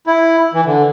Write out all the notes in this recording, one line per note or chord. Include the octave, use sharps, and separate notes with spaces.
E4
E3
D3